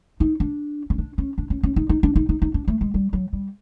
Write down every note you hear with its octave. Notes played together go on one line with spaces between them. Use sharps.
D#4
D4
C#4
D4
C#4
D4
C#4
C#4
D#4
D#4
D4
D#4
D#4
D#4
D4
A3
G#3
G3
F#3
G3